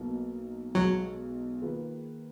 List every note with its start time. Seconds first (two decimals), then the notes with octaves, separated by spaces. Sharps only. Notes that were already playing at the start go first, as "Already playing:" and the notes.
Already playing: B1 B2 A#3
0.75 B1 B2 F#3 G#3
1.61 D#3 A#3 F4 G#4 B4